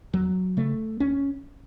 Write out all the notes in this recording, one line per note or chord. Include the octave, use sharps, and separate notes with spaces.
E2 F#3
C#3 A3
D#2 C#4